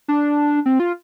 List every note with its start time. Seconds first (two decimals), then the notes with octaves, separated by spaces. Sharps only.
0.08 D4
0.66 C4
0.80 F4